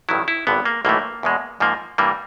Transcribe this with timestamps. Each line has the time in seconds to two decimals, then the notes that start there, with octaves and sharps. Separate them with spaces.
0.09 A1 G2 D#3 F#3 E4
0.28 E4
0.47 G#1 G2 D3 B3
0.65 A#3
0.85 B1 A2 E3 A3 A#3
1.23 E2 B2 G#3
1.60 G#2 F3 A#3
1.98 G2 E3 G3 A#3